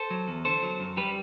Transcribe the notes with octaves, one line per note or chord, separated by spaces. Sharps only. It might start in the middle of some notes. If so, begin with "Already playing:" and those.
Already playing: A4 C5
F#3
E2
D3 A4 C5
F#3
F#2
G3 G4 B4